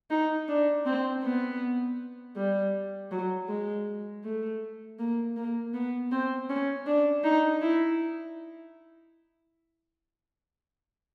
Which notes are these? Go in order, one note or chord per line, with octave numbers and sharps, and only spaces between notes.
D#4
D4
C4
B3
G3
F#3
G#3
A3
A#3
A#3
B3
C4
C#4
D4
D#4
E4